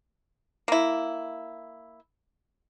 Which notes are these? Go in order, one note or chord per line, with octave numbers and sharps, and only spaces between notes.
A#3 E4